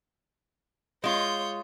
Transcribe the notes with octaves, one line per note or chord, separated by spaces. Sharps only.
G#3 F4 C#5 G6